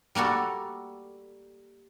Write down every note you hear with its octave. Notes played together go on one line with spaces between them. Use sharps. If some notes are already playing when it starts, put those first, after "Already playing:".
G3 A#3 F#4 A4